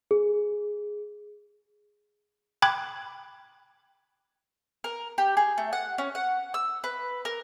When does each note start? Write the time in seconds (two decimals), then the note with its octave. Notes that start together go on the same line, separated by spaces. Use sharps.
0.11 G#4
2.62 G5 B5 D6 F#6 G#6
4.84 A#4
5.18 G4
5.37 G#4
5.58 A3
5.73 F#5
5.98 C#4
6.15 F#5
6.54 E6
6.84 B4
7.25 A#4